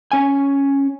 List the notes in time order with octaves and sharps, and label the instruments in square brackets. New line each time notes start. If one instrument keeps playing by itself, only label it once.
[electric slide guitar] C#4 G#5